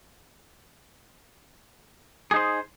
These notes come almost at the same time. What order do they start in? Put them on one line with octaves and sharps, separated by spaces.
G#4 D#4 C5